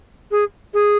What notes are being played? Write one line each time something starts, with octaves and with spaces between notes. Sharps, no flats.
G#4
G#4